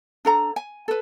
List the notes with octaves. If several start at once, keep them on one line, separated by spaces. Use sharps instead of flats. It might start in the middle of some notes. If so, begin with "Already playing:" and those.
D4 A4 A#5
G#5
A4 B4